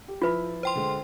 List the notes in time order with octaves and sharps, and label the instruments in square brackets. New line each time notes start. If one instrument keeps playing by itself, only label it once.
[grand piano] G4
[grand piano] F3 E4 B5 [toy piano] F4 B4
[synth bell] C5 G5 C6
[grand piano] D3 G#3